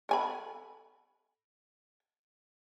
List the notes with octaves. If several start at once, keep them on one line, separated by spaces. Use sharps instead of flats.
A4 G#5 B5